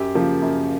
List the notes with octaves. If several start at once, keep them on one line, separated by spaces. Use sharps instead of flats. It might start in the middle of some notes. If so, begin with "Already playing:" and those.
Already playing: F#2 G4
C#3 F3 A#3
F#2